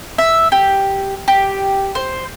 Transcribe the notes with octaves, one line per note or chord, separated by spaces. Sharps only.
E5
G4
G4
C5